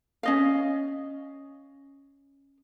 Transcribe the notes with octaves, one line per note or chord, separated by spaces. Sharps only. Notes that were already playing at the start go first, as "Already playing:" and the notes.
C#4 D#5 F5